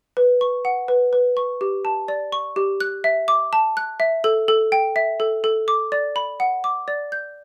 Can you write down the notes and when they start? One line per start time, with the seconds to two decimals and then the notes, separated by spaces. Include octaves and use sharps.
0.17 B4
0.41 C#6
0.65 F#5
0.88 B4
1.13 B4
1.37 C#6
1.61 G4
1.85 A5
2.08 D5
2.32 C#6
2.56 G4
2.80 F#6
3.04 E5
3.28 D6
3.53 A5
3.77 F#6
4.00 E5
4.24 A4
4.48 A4
4.72 G5
4.96 E5
5.20 A4
5.44 A4
5.68 D6
5.92 D5
6.16 B5
6.40 F#5
6.64 D6
6.88 D5
7.12 G6